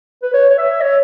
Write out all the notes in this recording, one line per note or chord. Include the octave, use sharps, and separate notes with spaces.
B4
C#5
C#5
E5
C#5